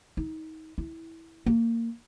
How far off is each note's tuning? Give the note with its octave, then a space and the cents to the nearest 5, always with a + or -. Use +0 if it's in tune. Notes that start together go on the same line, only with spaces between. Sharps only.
D#4 +30
E4 -10
A#3 -20